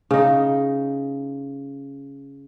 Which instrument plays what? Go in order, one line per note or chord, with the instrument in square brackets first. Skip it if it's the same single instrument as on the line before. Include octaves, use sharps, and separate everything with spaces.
[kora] C#3 D#4